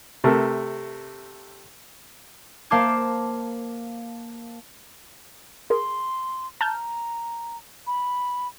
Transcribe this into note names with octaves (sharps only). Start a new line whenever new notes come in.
C3 A3 A#4
A#3 C5 F5 A5 D6 G#6
G#4 A#4 C6
A5 A#5 F6 G6
B5